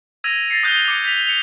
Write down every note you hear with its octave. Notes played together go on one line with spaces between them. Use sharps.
E6 G#6 A#6 D#7 F7
A6 A#6 C7 C#7
D#6 F#6 G6 C#7 D#7 G7
D6 C#7
G6 B6 F7
C#7 F7